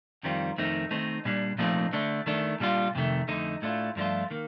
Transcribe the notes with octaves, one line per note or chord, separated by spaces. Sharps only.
F2 D#3 G3 C4 F4
F2 D#3 A3 C4 D#4
D#3 A3 C4 D#4
A#2 G3 D4
A#2 F3 A3 C4 D#4
D3 A3 D4
D#3 A3 D4
A#2 G3 D4 F4
F2 C3 D#3 A3
F2 D3 A3 D#4
A2 A3 D4 F4
G2 F3 A3 D4 F4
D#3 A#3